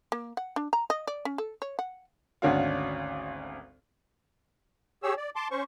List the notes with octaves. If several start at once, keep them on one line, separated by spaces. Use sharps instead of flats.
A#3
F#5
D4
A#5
D#5
D5
C#4
A4
C#5
F#5
G#1 D2 C#4 D4 F#4 F5
G4 G#4 C#5 E6
D5
A5 C6 D6
C#4 C5 C#6